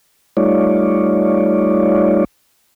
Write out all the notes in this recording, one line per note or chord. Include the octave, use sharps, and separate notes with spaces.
G3 A3 D#4 F4 C#5 D5